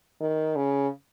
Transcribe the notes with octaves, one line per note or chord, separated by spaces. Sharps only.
D#3
C#3